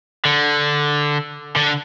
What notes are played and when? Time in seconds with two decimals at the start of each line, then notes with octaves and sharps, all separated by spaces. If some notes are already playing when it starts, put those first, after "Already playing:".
0.25 D3
1.56 D3